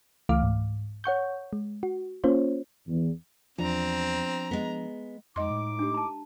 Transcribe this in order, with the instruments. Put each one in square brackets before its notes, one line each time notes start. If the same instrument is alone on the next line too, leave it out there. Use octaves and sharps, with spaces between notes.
[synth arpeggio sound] C#2 E3 A3 F5 D6 F6
G#2
C#5 F#5 C#6 G6
G#3
F#4
A#3 C#4 F4 C5 C#5
[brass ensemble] E2
[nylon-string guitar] E2 [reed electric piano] F3 D4 [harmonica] C4 [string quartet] A#5
[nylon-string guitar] G#3 B3
[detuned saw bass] F2 [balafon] G#3 D#5 C6 [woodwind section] D#4 D6
[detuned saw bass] A2
[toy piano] D4 G4
A5 A#5